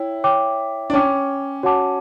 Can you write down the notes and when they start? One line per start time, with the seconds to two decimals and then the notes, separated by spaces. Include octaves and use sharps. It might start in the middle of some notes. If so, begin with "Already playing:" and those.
Already playing: E4 C#5 G5
0.24 C#5 G5 D6
0.90 D4
0.93 C#4 C#5 G5 D6
1.63 F#4 C#5 F#5 A5 D6